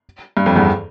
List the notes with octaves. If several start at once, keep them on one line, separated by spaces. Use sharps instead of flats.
G2
F2
E2 G2